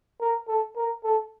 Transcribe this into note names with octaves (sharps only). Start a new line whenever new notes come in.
A#4
A4
A#4
A4